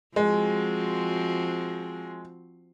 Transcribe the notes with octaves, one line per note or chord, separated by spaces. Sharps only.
F3 G#3 C4 F#4